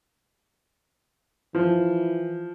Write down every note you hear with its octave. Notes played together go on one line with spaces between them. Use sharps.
E3 F3